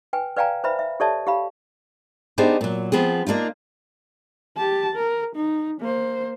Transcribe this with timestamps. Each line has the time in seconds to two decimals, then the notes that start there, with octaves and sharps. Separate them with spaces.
0.13 B4 G5 G#5
0.36 B4 D5 F5 G5 G#5 A#5
0.64 B4 C5 E5 B5
0.79 E5
1.00 G4 A4 C#5 D5 E5 A5
1.27 G4 F5 B5
2.38 B3 D4 D#4 G4 G#4 C5
2.61 A#2 F#3
2.92 F3 B3 C4 G#4
3.27 A#3 D4 D#4 F4
4.57 G4 A5
4.96 A#4
5.36 D#4
5.81 A#3 C5